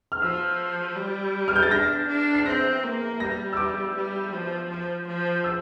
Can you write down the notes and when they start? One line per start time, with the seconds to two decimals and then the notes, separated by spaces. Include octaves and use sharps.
0.12 F6
0.21 F3 E6
0.96 G3
1.48 F6
1.56 G6
1.63 A6
1.71 D4 A#6
2.08 D4
2.34 C7
2.46 C4 A#6
2.83 A#3
3.20 G3 A#6
3.53 E6
3.57 D6
3.95 G3
4.32 F3
4.70 F3
5.07 F3
5.44 E6